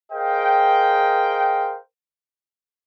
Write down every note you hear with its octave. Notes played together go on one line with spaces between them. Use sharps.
G#4 A#4 C5 D#5 F5 G5